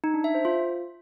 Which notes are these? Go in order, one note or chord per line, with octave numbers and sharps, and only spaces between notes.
D#4
D4
E5
C5
F4